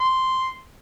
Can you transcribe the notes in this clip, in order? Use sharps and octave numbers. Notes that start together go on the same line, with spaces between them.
C6